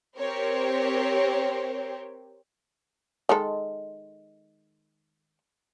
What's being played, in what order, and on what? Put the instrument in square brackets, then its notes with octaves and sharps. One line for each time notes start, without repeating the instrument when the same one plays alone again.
[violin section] C4 G4 A#4 C5 C#5
[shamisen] D#3 G#3 A4